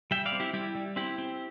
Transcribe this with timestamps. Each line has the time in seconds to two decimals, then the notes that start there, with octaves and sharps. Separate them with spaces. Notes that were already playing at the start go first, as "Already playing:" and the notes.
0.11 G3 E5 G5
0.26 D5 F5
0.32 C4
0.40 E4 G4
0.53 G3 E4 G4
0.75 G3
0.96 C4 E4 G4
1.18 C4